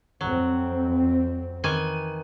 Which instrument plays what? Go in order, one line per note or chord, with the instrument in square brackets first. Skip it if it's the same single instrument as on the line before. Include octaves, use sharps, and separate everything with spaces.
[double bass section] F2 C4 [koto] F#3
[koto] D#3 E3 G#5